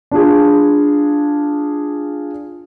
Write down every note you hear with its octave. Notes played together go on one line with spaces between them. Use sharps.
D4 F4 G#4